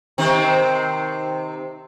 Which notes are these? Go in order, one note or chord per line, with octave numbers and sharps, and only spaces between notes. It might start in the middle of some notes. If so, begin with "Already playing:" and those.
C3 D#3 C4